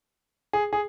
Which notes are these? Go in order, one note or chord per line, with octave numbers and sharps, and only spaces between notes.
G#4
G#4